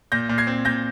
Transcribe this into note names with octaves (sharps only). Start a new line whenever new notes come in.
A#2 G6 A#6
A#2
G#6 C7
C4
A#2 G6 A#6